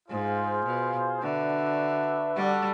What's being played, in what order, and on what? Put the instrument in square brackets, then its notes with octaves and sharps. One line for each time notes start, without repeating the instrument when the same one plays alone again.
[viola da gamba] G#2 [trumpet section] F4 G#4 C5 F5
[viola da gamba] B2
[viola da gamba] D3 [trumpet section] D4 F#4 B4 E5
[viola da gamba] G3 [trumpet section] F#4 A4 D5 F#5